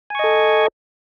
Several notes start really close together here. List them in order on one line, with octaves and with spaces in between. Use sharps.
G#5 C#6 D#5 A4